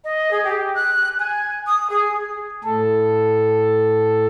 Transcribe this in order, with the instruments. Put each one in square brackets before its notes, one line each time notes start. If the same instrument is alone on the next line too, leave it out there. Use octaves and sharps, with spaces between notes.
[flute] D#5
G#4
G4
F#6
G#5
D#6
G#4
[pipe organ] A2 A4